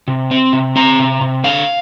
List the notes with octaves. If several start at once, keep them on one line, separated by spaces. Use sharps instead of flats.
C3
C4
C3
C4 A#5
C3
C3
D3 F5